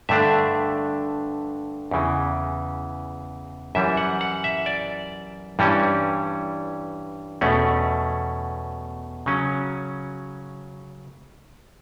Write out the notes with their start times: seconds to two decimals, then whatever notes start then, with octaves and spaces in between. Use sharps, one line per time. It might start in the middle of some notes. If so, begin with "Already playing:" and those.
0.09 G2 D3 A3 D4 E5
1.91 E2 C#3 E3
3.75 F#2 E3 G3 E5
3.97 F#5
4.21 F#5
4.44 E5
4.66 D5
5.59 G2 E3 G3 C#4
7.41 E2 B2 A3 C#4
9.26 C#3 F#3 C#4